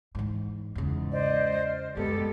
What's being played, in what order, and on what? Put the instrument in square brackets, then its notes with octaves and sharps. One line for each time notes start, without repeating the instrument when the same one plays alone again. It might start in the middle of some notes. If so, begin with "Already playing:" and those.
[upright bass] G#2 E3
[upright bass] E2 C#3 [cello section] G#2
[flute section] C5 D5 D#5
F6
[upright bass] F#2 B2 [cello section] G#3 B3 G4 [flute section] A4